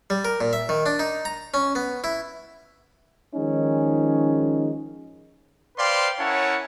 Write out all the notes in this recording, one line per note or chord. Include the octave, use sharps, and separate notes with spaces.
G3
A#4
A#2
E5
D#3
D4
D#4
A#5
C#4
B3
E4
D#3 F3 G#3 C#4 D#4
B4 C5 D5 F5 G5 C6
C#4 E4 A#4 C#5 F#5 A5